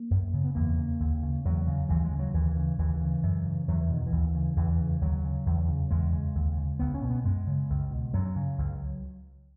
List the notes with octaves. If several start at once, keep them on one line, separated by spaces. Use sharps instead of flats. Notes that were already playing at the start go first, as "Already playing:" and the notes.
Already playing: A#3
F#2
C#3
B3
E2 A#3
C#3
D#2
C#3
E2 F#3
C#3
D#2 E3
G#3
C#3
F#3
D#2 E3
C#3
D#2 E3
C#3
F#2
C#3
E2 F#3
E3
B2 D#3
E3
D#2
C#3
E2 E3
C#3
D#2 F#3
C#3
E2
C#3
E2 G#3
C#3
D#2
C#3
C#2 B3
C#4
B2
B3
F#2 G#3
C#3
C#2
B2
F#2 F#3
C#3
C#2